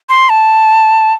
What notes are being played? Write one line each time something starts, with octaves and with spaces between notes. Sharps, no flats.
C6
A5